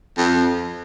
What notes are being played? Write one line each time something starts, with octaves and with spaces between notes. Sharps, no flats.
F2